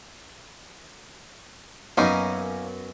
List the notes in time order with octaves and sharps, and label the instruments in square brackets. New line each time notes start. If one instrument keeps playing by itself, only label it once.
[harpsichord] F#2 B3 [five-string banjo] A#3 C#4 D#4